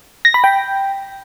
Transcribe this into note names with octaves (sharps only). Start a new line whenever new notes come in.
A#6
B5
G5